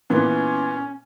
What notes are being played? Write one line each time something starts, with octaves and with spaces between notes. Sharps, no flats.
A#2 E3 B3 C#4